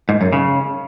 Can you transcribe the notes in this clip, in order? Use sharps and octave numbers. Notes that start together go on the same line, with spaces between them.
G#2
F#2
C#3